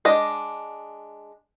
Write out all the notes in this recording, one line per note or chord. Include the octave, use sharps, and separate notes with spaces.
G#3 D4 D#5